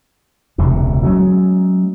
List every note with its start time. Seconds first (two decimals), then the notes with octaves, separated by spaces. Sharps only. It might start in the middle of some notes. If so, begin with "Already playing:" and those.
0.58 E1 C#2 C3
1.04 F#3 G#3 A3 C#4